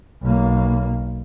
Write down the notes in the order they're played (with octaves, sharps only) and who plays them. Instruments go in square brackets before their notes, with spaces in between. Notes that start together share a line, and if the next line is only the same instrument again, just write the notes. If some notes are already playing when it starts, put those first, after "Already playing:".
[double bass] B1 A#3